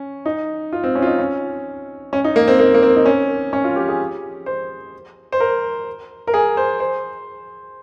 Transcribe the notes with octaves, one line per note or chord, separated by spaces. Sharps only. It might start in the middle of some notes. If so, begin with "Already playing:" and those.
Already playing: C#4
D#4
F4
C4
C#4
F4
D#4
C#4
C#4
D#4
A#3
C4
A#3
A#3
C4
D#4
C#4
C#4
F4
G4
G#4
C5
C5
A#4
A#4
G#4
C5
C5